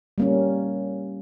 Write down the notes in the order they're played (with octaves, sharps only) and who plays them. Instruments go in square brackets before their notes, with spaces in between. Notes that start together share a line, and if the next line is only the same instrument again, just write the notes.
[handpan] G3 A#3 C#4